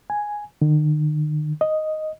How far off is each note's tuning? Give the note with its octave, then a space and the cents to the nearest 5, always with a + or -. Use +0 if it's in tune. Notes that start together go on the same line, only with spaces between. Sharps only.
G#5 +0
D#3 -45
D#5 +0